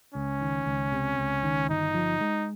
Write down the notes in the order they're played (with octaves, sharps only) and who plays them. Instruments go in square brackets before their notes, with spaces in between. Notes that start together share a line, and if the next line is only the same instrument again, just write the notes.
[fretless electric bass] C#2 [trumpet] C#4
[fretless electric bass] D#3
C#2
C3
C#2
D#3
[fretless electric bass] G1 [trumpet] D#4
[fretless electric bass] F3
G#3